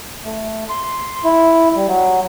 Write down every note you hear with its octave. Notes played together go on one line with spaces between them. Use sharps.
A3
C6
E4
G3
F#3